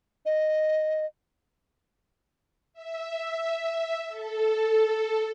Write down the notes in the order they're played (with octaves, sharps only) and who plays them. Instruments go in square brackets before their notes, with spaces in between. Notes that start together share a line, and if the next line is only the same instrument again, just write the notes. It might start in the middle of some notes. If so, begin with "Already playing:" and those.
[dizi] D#5
[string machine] E5
A4